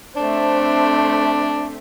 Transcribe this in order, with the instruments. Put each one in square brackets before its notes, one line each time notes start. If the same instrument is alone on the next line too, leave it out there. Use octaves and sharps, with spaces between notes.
[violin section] A3 C4 C5 [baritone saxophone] D4